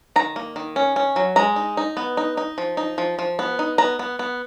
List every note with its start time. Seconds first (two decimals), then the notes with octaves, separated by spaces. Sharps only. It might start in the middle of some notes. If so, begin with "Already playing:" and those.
0.16 D#3 A#5
0.36 A#3
0.56 D#3
0.76 C#4
0.96 C#4
1.16 F#3
1.36 G#3 A#5
1.56 D#4
1.77 D#4
1.97 B3
2.17 D#4
2.37 D#4
2.58 F3
2.77 D#4
2.98 F3
3.19 F3
3.39 B3
3.59 D#4
3.78 B3 A#5
3.99 B3
4.19 B3